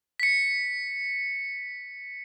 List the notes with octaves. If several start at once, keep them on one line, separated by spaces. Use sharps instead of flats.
B6 C#7